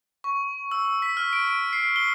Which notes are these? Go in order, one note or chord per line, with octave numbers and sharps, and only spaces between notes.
C#6
E6
B6
F6
D7
D7
C7
G7